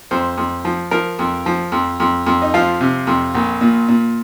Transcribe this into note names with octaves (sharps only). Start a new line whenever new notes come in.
F2 C5
F2
F3
F3 A#4
F2
F3
F2
F2
F2
D#4
F3 F4
C3
F2
A#1
A#2
A#2